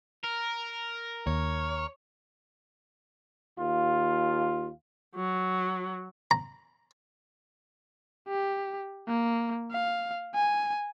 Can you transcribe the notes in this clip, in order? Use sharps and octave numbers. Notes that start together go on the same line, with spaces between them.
A#4
D#2 C#5
D#2 F4
F#3
A#5
G4
A#3
F5
G#5